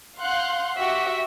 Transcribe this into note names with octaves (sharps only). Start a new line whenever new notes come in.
F5 F#5 C6 F#6 G6
F#4 G4 E5 F#5